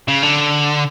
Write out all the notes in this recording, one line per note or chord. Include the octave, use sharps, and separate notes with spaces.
C#3
D3